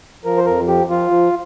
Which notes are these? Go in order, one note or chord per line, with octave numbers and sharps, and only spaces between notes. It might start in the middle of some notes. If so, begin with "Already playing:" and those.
F3 A#4
C5
F2 A#4
F3 G4
F3 F4
F3